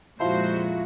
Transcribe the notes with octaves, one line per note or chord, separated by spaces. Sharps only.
F2 A#2 F3 G#3 E4 F#4 C5 F5